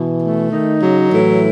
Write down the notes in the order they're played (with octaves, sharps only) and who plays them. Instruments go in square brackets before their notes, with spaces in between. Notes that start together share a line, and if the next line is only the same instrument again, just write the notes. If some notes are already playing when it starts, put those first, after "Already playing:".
Already playing: [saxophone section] B2 [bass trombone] E3
[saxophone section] A3
[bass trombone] D#3 [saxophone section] D#4
[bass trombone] C#3 [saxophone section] F#3
[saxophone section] A2 [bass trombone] E3